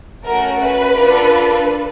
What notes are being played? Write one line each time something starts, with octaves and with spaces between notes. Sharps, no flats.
A3 C#4 F#4 A#4
B4
D4 F4 A4